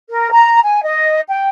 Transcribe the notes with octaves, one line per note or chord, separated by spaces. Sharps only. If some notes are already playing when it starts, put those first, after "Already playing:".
A#4
A#5
G#5
D#5
G5